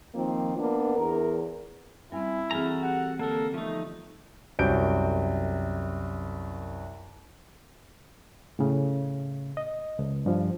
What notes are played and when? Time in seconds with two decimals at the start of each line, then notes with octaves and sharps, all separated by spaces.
0.15 D#3 F3 A#3 C4
0.57 A#3 B3 D4
0.96 E2 A#4
2.12 G3 C4 C#4 E4 G#5
2.51 E3 C4 F#4 G#4 A4 G#5 A#5 F6
2.82 G4 F#5
3.19 D3 A#3 A4 A#4
3.54 F3 A3 B3 D#4 C#6
4.59 C2 F#2 F#3 C5 G6 D7
8.59 A2 C#3
9.57 D#5
9.99 C#2
10.26 G2 F3